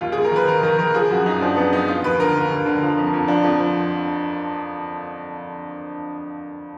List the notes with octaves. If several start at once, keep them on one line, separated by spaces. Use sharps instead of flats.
D#2 F4
D#2 G#4
A#4
D#3 B4
D#3 A#4
D#3 A#4
D#3 A#4
F3 G#4
F#2 F#4
F#2 D#4
F3 D4
F3 B3
F3 D#4
F3 F4
D#2 B4
D3 A#4
D3
D#2
D3
F3
F2
F2
F3 D4
F2
F3